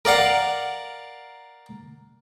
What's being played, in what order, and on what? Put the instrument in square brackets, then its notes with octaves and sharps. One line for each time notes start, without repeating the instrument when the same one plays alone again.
[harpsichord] A#4 D5 F5 F#5